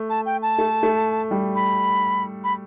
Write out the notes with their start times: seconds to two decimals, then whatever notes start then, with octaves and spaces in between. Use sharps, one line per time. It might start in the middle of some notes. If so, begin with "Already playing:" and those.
Already playing: A3
0.10 A5
0.26 G5
0.42 A5
0.58 A3
0.83 A3
1.31 G3
1.56 B5
2.44 B5